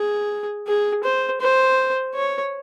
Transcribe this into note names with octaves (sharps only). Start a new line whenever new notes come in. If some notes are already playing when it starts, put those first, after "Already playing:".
Already playing: G#4
G#4
C5
C5
C#5